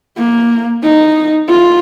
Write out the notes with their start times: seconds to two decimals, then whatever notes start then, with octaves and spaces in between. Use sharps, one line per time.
0.17 A#3
0.83 D#4
1.49 F4